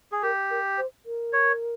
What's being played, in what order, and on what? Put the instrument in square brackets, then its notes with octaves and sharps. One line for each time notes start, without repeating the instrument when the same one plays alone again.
[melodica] G#4
[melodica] G4 [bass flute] A#4
[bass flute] A#4
C5
A#4
[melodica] C#5